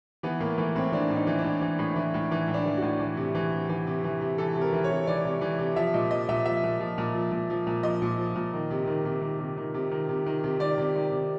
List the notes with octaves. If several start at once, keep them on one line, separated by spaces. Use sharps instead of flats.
E3 B3
A2 A#3
E3 A3
A2 C4
E3 D4
A2
D#4
E3
D4
A2
E3
A2
E3
A2
E3
A2
D4
E3
F#4
A2
E3
C3
E3
C3
E3
C3
E3
C3
E3 A4
C3
A#4
E3
C#5
C3
E3 D5
C3
E3
C3
F3 E5
A#2 D#5
F3 D#5
A#2 E5
F3 E5
A#2
F3
A#2
F3
A#2
F3
A#2
F3 D#5
A#2
F3
A#2
D#3
C3
D#3
C3
D#3
C3
D#3
C3
D#3
C3
D#3
C3
D#3 D5
C3
D#3
C3